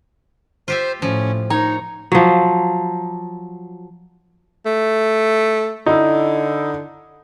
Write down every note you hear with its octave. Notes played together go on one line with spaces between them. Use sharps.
F4 G4 C5 E5
A2 F3 C#4
D#4 C#5 A#5
F3 F#3
A3
D3 D#4 E4